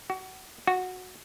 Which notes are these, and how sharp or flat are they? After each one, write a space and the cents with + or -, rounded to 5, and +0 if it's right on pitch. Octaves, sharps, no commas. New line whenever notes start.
F#4 +25
F#4 -10